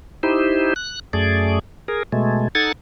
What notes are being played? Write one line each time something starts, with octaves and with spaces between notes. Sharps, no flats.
D#4 E4 G4 C5
F#6
F#2 A3 G#4 D5
G#4 A#4
B2 G#3 A3
D#4 A4 F#5 G#6 A6